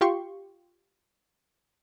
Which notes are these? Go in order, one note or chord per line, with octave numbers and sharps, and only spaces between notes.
F4 G4 C6 C#6